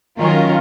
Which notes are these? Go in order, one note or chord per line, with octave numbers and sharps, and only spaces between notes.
D#3 F#3 C#4 F4 A#4